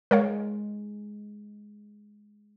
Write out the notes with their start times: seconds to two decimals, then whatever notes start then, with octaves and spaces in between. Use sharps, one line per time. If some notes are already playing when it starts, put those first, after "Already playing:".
0.11 G#3 A#4 C#5 F5